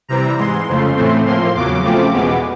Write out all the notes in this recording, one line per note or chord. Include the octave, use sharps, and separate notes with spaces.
C3 E3 G3 C4 A#5
G#2 E3 G#3 C6
F2 C#3 F3 A3
A2 E3 A3 C4
A2 F3 A#3 C6
E2 C#3 F#3 D6
C#3 F3 A3 C4
E2 B2 G#3 B3